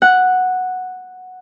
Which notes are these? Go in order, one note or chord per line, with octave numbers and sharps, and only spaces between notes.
F#5